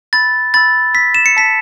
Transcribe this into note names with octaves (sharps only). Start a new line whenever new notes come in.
B5 E6 A6
B5 E6 A6
B5 E6 B6
E7
C#7
A5 E6 B6